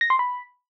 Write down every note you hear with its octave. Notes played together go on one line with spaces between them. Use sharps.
A#6
C6
B5